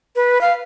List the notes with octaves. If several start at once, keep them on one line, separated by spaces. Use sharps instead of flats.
B4
F5